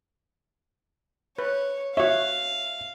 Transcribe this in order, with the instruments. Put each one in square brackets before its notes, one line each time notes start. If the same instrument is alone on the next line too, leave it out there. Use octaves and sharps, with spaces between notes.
[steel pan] B4 [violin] C#5
[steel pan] F#4 C#5 [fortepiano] E5 [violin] F5